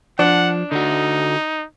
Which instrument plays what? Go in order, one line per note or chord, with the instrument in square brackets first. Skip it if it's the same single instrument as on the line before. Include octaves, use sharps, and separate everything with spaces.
[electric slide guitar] F3 [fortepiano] D4 [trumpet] F#5
[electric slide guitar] D3 F#4 [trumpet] D#4